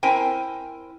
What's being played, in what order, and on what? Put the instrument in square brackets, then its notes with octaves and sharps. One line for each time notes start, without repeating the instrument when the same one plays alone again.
[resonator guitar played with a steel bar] C4 E4 A#4 C5 G5 G#5